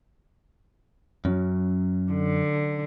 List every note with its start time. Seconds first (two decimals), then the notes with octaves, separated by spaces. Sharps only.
1.25 F#2 F#3 C#4
2.12 D3